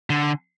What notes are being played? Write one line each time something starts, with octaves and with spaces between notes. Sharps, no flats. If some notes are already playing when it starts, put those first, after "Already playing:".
D3